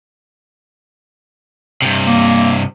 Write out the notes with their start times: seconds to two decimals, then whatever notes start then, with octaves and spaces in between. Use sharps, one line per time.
1.82 G2 C3
2.07 A#3